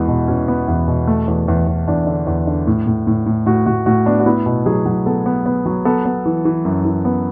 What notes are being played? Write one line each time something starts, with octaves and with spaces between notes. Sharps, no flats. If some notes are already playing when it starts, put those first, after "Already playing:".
Already playing: E2 G#3 B3 E4 F#4
B2
B2 C#4
B3
E2
B2
A3
E2
E2
E2
E2 D4
D3
E2
D3
A2
A2
A2
A2
A2 F#4
A2 F#4
A2 F#4
B3 D4
F#4
B3 E4
B2
F#3 G#4
F#3
B3 A4
B3
B3
F#3
B3 A4
B3
E3
E3
F#2
E3
B3